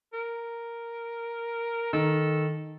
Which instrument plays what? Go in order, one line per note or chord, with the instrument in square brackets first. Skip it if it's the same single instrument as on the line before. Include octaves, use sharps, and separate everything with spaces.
[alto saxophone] A#4
[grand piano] D#3 [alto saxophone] A4